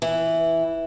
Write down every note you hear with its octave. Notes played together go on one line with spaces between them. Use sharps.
E3